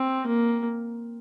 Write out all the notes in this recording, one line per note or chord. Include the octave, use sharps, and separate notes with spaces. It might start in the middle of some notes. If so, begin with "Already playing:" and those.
Already playing: C4
A#3